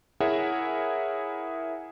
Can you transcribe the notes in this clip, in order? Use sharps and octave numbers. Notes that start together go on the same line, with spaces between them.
E4 G#4 A#4 C#5 E5 F#5